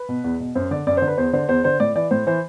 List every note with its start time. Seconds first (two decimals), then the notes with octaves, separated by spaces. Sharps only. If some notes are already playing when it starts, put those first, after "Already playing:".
Already playing: B4
0.09 B2
0.24 E2
0.40 B2
0.55 F#2 C5
0.71 D3 D5
0.87 F#2 D5
0.97 C5
1.02 D3
1.08 B4
1.18 E2 C5
1.33 D3 C5
1.49 E2 C5
1.64 D3 C5
1.80 A2 D5
1.95 E3 D5
2.11 A2 C5
2.27 E3 C5